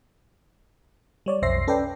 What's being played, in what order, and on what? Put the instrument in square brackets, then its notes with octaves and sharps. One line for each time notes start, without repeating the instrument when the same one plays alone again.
[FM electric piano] G3 C#5 D5
B1 F2 C5 E5 A#6 C7
C#4 A4 B4 D5 G5